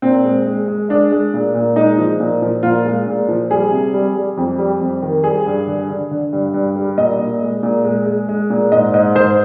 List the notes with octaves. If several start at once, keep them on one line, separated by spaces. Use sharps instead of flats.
A#2 C4
G#3
G#3
G#3
G#3 D4
G#3
A#2
A#2
G#3 D#4
F3
A#2
F3
A#2 F4
G#3
A#2
F3
G3 G#4
C3
G3
G3
F2
G3
F2
D#3
G3 G#4
G2
D3
D3
D3
G2
G2
G3
A#2 D#5
A#2
G#3
A#2
G#3
G#3
G#3
A#2
G#2 D#5
G#2 D#5
G#2 C5